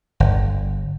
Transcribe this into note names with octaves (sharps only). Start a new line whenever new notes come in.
G1